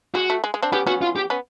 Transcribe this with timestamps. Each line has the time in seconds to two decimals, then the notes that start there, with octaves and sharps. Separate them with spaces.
0.14 G#3 F#4
0.30 A3
0.44 G#3
0.54 G#3
0.62 C4 D4
0.72 B3 C#4 G4
0.87 B3 C#4 F#4
1.02 F4
1.16 G4
1.30 B3 C#4